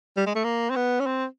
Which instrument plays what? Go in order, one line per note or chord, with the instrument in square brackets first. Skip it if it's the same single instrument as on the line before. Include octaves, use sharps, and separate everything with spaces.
[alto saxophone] G3
G#3
A3
A#3
C4
B3
C#4
C4